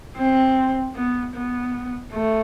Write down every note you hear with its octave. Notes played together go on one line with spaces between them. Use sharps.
C4
B3
B3
A3